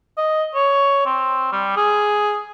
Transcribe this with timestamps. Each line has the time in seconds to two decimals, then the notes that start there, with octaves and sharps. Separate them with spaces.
0.18 D#5
0.55 C#5
1.06 C4
1.52 G3
1.76 G#4